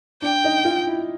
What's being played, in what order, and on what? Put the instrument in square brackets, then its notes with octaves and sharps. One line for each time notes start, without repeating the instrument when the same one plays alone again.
[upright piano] D4 [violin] G5
[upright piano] D#4
F4
E4